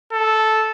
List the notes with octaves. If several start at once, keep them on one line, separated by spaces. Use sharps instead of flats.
A4